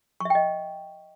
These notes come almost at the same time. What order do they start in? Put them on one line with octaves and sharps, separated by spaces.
C#6 E5 G5 D#5